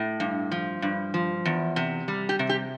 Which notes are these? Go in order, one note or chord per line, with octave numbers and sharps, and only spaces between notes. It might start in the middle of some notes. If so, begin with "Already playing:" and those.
Already playing: A2
G2
F3
G2
F3
E2
C3
G3
G4
C3
G4